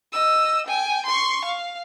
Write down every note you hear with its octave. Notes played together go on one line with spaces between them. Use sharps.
D#5 E6
G5 G#5
C6 C#6
F5